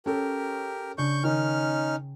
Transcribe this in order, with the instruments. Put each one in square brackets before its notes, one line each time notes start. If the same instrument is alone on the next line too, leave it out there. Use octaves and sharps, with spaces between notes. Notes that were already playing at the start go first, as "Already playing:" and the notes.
[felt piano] C#4 A4 [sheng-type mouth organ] G4 A#4
[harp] C#3 [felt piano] D4 [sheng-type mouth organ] C#6 G6
[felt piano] D#3 [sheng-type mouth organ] C#4 D#4 F6 [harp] G5